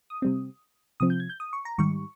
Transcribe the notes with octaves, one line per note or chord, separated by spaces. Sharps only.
D#6
C3 G3 C4
C3 F3 C4 D#6
G6
G#6
G6
D#6
C#6
A#5
G#2 D#3 G3 C#6